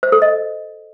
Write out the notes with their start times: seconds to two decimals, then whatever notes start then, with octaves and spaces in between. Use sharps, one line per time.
0.03 C5
0.12 A4
0.22 D#5